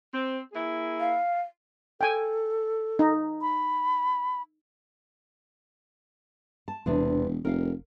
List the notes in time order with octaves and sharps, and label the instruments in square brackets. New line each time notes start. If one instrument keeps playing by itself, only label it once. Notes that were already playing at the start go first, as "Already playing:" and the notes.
[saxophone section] C4
A#3 E4 G#4
[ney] F5
[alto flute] A4 [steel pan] G5 G#5
[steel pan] D#4
[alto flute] B5
[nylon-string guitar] A5
[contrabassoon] E1 [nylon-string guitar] E2 C3 D4
[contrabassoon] F1 [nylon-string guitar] A#4 F5